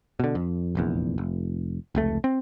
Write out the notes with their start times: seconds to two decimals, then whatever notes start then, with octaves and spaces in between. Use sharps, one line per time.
0.20 B2 D3
0.35 F2
0.75 F1 A#1 E2
1.18 F1
1.95 F1 C#2 A3
2.24 C4